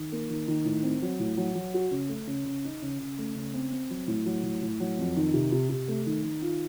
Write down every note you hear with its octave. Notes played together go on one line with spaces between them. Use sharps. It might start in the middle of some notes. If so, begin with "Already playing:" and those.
Already playing: D#3
A#3
D#3
D#3
A2
C4
F#3
A2
F#3
F#3
F#4
C#3
A3
C#3
C#3
D#4
C#3
C#3
A3
C#3
C4
C4
F#3
A2
F#3
A2
A2
F#3
F2
D#3
C3
C3
C3
A3
D#3
D#3
F4